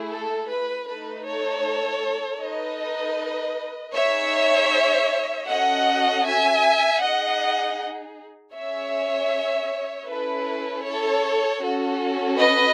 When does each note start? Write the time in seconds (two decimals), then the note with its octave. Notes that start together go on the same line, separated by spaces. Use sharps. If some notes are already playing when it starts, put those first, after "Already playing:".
Already playing: A3 E4 G#4
0.11 A4
0.49 B4
0.88 A3 D#4 A4 B4
1.25 A4 C#5
2.40 D#4 A4 B4 D#5
3.94 D#4 G#4 C#5 E5
5.47 C#4 F#4 A4 D#5 F#5
6.24 E5 G#5
7.00 D#4 G#4 D#5 F#5
8.53 C#4 G#4 C#5 E5
10.07 C#4 E4 A4 B4
10.84 A4 C#5
11.60 C#4 F#4 A4
12.38 B4 D#5